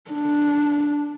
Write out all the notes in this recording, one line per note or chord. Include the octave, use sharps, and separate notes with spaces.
D4